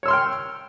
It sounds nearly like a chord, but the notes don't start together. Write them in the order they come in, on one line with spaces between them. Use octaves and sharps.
C#5 E6 C6 F6 G5